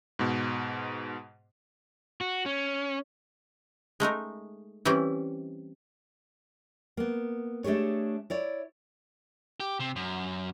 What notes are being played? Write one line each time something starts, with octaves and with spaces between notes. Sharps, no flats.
G#2 B2
F#4
C#4
G#3 A3 D#4 A#4
E3 G3 C4 C#4 E4
A#3 B3
A3 D4 G4 G#4 C#5
E4 C#5 D5
G4
C3
F#2